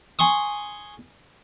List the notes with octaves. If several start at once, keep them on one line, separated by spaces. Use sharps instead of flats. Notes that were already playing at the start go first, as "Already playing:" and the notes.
G#5 C6 C#6 D#6